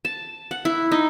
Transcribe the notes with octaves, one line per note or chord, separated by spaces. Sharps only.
A5
F#5
E4
D#4